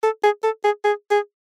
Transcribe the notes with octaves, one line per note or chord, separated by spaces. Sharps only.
A4
G#4
A4
G#4
G#4
G#4